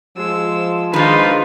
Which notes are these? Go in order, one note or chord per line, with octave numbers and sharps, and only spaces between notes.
F3 G#3 E6
D#3 G#3 D4 D#4 F4 B4